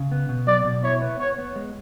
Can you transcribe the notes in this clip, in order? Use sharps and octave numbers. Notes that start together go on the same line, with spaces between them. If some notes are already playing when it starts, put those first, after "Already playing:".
Already playing: C#3
B3
B2
F#3 D5
B2
E4 C#5
B3
B3 C#5
B3
G#3